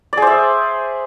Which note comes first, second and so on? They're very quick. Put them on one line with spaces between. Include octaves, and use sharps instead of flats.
D5 G#4 C5 E5